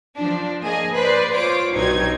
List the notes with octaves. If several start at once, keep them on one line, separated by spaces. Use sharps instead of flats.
F3 D4
A#3 G#4 D#5 G#5
B4 C5 D5
F4 C5 C#5 D6
B1 G2 F#3 D#4 G#6